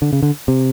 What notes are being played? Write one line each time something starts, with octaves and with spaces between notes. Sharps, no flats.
D3
C#3
D3
C3